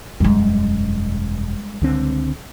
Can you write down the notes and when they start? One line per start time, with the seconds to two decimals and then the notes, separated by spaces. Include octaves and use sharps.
0.20 E1 F#2 G3 G#3
1.82 C#2 D3 C4